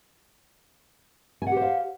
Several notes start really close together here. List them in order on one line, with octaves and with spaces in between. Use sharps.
G#5 F#5 G4 C5 F5